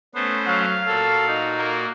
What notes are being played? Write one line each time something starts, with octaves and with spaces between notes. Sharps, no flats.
A3 B3 C#4 C5
F#3 F5
A#2 F#4 A4
D#4
A#3